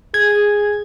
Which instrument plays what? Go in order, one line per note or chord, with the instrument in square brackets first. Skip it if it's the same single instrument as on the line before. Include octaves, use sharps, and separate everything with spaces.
[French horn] G#4 [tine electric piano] G#6